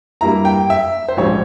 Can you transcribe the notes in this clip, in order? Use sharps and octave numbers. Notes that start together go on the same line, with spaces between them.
G2 G3 A#3 E4 A#5
G5
E5
C5
A#1 G#2 G3 C#4 C#5